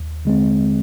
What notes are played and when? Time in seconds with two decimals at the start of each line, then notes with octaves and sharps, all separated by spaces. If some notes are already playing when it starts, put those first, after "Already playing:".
Already playing: D#2
0.25 D3 G#3 C4